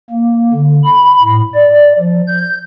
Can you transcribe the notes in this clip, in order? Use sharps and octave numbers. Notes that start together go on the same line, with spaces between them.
A#3
D3
B5
A2
D5
F3
G6